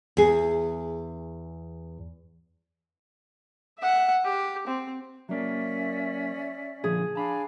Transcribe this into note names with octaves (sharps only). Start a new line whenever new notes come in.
E2 G#4
E5 F#5
G4
C4
F#3 A#3 C#4 D5 E5
A#2 D3 F3 G#4
D4 F5 G#5 A5 B5